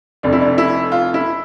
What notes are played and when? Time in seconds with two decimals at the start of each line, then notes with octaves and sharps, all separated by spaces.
0.23 F1 F2 C3 D4
0.33 E4
0.41 D4
0.58 E4
0.92 F4
1.14 E4